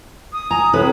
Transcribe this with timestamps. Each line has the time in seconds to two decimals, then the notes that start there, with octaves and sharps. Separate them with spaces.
0.33 D#6
0.51 G#5 A#5
0.73 A2 C3 E3 B4